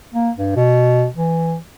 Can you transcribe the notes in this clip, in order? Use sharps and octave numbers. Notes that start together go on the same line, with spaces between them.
A#3
G2
B2
E3